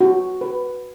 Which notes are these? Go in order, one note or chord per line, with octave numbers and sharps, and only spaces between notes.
F#4
B4